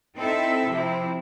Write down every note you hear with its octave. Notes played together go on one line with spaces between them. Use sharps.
C4 D#4 E4 A4 E5
C3 F3 C4 E4